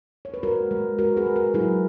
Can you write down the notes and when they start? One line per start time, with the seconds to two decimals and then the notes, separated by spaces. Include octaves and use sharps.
0.25 C#5
0.34 B4
0.43 G#3 F#4 A#4
0.71 G#3
0.98 G#3 F#4 A#4
1.17 G#4 B4
1.26 G#3
1.36 F#4 A#4
1.54 F#3 E4 G#4